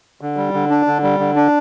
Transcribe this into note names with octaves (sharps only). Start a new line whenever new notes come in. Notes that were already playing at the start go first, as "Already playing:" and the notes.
D3
G3
D3
D4
D3
G3
D3
D4